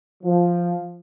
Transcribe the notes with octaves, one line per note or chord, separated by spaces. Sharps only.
F3